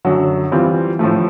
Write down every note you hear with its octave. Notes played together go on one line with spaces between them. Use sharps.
F#2 D3 F#3
E3 G3 C4 F4
A2 F3 A3